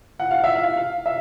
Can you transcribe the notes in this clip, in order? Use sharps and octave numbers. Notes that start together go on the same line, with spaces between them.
F#5
F5
E5
F5
F5
E5